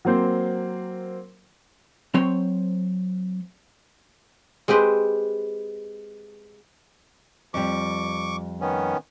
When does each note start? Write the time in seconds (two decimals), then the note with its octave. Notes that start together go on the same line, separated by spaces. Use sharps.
0.05 F#3 A#3 C4 C5
2.14 F#3 C4 C5 C#5 C6
4.68 G#3 C4 G4 B4
7.54 F2 G3 C#6 D6
8.61 D#3 B3 C#4